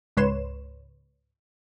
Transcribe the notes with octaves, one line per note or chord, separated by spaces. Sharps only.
C#2 G#2 B4 C#5 C6 E7